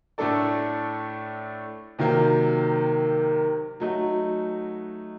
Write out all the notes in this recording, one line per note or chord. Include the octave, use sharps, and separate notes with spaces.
A2 A3 D4 A4 D5
C3 D#3 F#3 A#3
F#3 A3 D#4 F#4